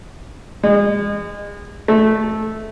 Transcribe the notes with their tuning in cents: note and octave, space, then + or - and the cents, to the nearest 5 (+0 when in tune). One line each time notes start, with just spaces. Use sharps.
G#3 -30
A3 -10